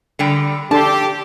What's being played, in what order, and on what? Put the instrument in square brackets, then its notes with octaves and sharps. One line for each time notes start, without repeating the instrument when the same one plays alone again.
[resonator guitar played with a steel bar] D3 G3 G5
[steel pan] D4 A4 C6 [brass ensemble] G4 [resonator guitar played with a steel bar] A5